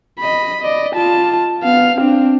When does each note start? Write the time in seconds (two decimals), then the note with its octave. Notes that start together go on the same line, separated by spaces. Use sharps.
0.19 D#5 B5
0.61 D5 D#5
0.95 F4 A5
1.63 B3 F5
1.97 C4 D4